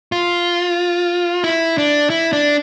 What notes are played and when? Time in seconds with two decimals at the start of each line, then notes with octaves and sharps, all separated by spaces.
0.12 F4
1.44 E4
1.78 D4
2.10 E4
2.33 D4